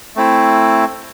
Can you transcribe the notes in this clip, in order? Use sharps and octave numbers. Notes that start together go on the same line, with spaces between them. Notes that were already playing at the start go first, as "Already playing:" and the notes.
A3 C4 E4